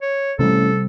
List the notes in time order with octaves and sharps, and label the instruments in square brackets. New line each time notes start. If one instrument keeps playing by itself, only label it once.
[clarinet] C#5
[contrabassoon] A1 [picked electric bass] C3 G3 [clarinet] A4